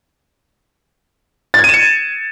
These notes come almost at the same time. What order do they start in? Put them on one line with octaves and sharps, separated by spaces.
A6 G#6 D#7 E7 C#7